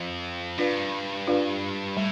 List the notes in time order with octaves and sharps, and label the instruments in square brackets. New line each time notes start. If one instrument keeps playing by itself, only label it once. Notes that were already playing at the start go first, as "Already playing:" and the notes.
Already playing: [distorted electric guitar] F2
[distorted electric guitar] G2 [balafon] D4 F4 B4 D5 F5
[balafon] D4 F4 B4 D5 F5
[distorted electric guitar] A2 [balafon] G3